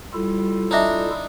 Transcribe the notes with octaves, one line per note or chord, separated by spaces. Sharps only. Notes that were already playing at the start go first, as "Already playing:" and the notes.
G3 E4 F4 A4
D4 D#4 D5 E5